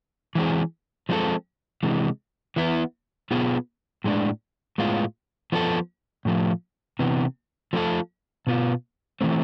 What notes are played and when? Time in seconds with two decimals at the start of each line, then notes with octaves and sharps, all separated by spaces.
0.35 E3 G#3 C4 G#4
1.09 F3 G#3 C4 E4 A4
1.83 C3 E3 G#3
2.56 E3 B3 E4
3.31 B2 B3 F4 G#4
4.04 A2 G#3 D4
4.78 A2 G#3 B3 F4
5.52 F3 B3 D4 A4
6.25 A2 F3 A3
6.99 C3 E3 B3
7.73 F3 A3 C4 F4 A4
8.47 B2 B3 F4
9.21 E3 A3 C4